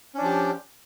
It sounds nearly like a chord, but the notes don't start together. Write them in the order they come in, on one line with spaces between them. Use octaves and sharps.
C#4 D4 F3 G4